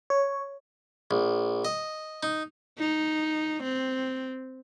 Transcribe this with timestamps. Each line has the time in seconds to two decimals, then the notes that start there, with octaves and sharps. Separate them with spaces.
0.10 C#5
1.11 A#1
1.65 D#5
2.23 D#4
2.78 D#4
3.63 C4